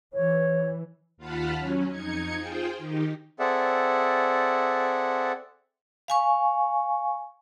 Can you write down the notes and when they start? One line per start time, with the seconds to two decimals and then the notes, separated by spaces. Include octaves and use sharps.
0.13 E3 C#5
1.17 D#2 F4 F5 F#5 A5 B5
1.57 F#3 C#4
1.89 F2 D#4 G#6 C#7
2.37 F4 G#4 C5 G5
2.78 D#3 D#4 G4
3.39 C4 G#4 A4 D5 E5 F#5
6.08 F5 G#5 C#6